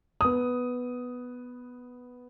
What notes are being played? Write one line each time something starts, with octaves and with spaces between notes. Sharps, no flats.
B3 D#6